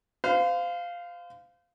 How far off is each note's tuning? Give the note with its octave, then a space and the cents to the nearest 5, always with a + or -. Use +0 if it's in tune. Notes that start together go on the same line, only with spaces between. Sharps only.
C5 -35 F5 +0